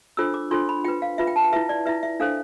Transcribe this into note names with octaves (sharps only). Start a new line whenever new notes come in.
D4 F4 A4 C5 E6
D6
D4 F4 A4 C5 C6
B5
F4 B4 G5
F5
F4 B4 E5
G5
A5
G5
E4 B4 E5
D5
E4 B4 E5
E5
D4 A4 C5 F5